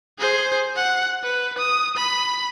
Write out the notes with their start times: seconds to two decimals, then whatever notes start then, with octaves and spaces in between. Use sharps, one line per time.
0.19 G#4 C5
0.76 F#5
1.23 B4
1.58 D#6
1.97 B5